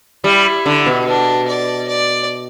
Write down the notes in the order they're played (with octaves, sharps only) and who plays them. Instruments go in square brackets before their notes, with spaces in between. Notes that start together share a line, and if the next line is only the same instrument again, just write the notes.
[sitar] G3 [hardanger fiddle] E4
[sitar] D3
B2
[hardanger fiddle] D4
D5
D5